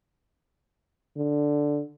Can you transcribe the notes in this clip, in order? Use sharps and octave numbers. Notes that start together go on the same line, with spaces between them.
D3